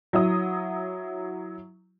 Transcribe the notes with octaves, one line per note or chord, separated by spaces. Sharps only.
F#3 E4 D#6